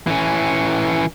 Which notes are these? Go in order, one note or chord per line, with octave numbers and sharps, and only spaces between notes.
E3 C#4